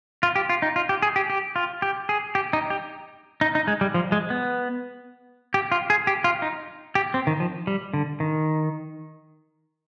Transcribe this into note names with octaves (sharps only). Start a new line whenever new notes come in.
F4
G4
F4
D#4
F4
G4
G#4
G4
G4
F4
G4
G#4
G4
D#4
G4
D#4
D#4
G#3
G3
F3
G#3
B3
G4
F4
G#4
G4
F4
D#4
G4
C4
D#3
F3
G3
D3
D#3